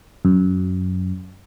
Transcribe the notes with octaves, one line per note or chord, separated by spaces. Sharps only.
F#2